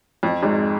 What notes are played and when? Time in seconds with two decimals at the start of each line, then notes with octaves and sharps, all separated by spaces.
0.23 F2
0.43 G#1 G#2